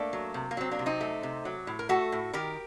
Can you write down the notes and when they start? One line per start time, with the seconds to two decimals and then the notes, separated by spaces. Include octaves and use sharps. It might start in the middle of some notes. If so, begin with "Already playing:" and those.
Already playing: A3 A#3 D4
0.13 F#3
0.34 C3
0.51 A#3
0.57 F#3 C4
0.71 A#3 D4
0.79 C3
0.86 C4 D#4
1.01 A3
1.23 C3
1.45 F#3
1.67 A2
1.79 A#4
1.89 A3 F#4 A4
2.12 A2
2.33 D#3 G4 A#4